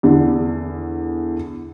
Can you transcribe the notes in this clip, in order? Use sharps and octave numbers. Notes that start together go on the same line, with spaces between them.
E2 D3